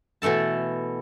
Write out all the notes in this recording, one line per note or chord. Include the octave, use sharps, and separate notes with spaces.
B2 E3 A3 A4 A5